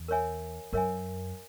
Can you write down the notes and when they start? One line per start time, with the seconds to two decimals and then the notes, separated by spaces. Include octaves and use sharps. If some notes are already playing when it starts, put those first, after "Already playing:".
Already playing: E2
0.08 A#4 C#5 E5 G#5
0.73 F#2 A#4 C#5 E5 G#5